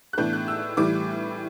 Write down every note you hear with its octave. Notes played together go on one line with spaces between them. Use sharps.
F#6
A2 E3 B3 D4 G6
F#6
E6
A2 E3 G3 D6